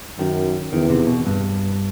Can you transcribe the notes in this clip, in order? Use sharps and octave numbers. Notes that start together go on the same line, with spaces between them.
F#2 D#3
E2 D#3
C3
B2
G2